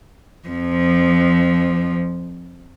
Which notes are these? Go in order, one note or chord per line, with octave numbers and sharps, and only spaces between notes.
F2 F3